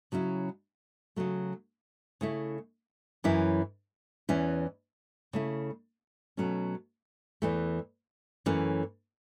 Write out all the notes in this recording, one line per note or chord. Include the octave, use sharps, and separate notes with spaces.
C#3 F#3 C#4 E4
C#3 F#3 A3
C#3 A3 E4
F#2 E3 C#4 E4
E2 E3 C#4 E4
C#3 A3 E4
B2 F#3 A3 C#4
E2 E3 A3
F#2 E3 A3 C#4